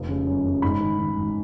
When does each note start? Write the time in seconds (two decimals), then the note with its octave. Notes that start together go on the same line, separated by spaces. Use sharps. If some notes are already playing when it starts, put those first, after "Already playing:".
Already playing: F1 F3
0.09 C#3
0.27 F#2
0.44 C#3
0.62 G#2 B5
0.81 D#3
0.98 D#3
1.16 G#1